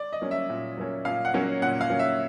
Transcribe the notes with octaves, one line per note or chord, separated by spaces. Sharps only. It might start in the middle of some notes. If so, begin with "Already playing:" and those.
Already playing: D5
D#5
F#3 A#3 C#4
E5
A#2
F#3 A#3 C#4
A#2 F5
F#5
F#3 A#3 C#4
A#2 F#5
F5
F#3 A#3 C#4
E5